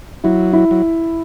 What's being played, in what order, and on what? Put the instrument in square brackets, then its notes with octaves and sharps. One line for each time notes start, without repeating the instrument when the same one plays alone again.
[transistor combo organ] F#3 [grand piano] E4
[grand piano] E4
[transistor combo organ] F#3